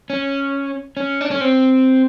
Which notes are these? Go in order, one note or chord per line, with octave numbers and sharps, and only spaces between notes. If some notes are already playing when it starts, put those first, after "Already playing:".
C#4
C#4
D4
C#4
C4